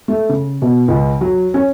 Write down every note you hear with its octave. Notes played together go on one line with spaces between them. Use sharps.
A3
C#3
B2
C#2
F#3
C#4